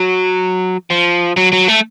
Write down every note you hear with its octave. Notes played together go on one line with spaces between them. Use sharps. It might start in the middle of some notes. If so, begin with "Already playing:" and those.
Already playing: F#3
F3
F#3
F#3
A3